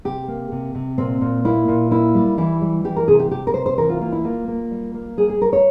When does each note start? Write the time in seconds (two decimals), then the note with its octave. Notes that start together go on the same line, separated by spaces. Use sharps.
0.05 C3 G4
0.28 A#3
0.52 C3
0.75 C3
0.98 A#2 C4
1.21 A#2
1.45 A#3 E4
1.68 A#2
1.91 A#3 E4
2.14 G3
2.38 E3 E4
2.61 G3
2.84 E3 G4
2.96 A#4
3.08 C3 G#4
3.19 G4
3.31 C3 G4
3.47 A#4
3.54 C3 C5
3.66 C5
3.78 E3 A#4
3.89 F4
4.01 A#3 F4
4.12 E4
4.24 A#3 F4
4.48 A#3
4.71 G3
4.94 A#3
5.17 G3 G#4
5.30 G#4
5.41 G3 A#4
5.53 C#5